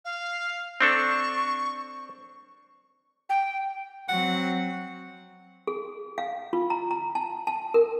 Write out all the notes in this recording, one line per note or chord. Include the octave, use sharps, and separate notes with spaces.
F5
C4 D4 A4 C#6
G5
F#3 C4 F#5
G#4
F5
F4
A#5
A#5
A5
A5
A#4